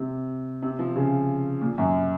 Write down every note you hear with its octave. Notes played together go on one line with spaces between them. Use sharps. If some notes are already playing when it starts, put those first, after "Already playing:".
Already playing: C3
C3
F3
C#3
A#2
F#2